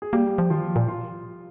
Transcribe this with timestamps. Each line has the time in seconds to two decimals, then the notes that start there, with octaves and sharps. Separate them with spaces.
0.02 G#4
0.13 G3 A#3 G4
0.38 F3
0.50 D#3 F3 F4
0.76 A#2
0.88 F4